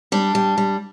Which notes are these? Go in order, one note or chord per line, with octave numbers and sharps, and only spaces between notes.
G3 D4
G3
G3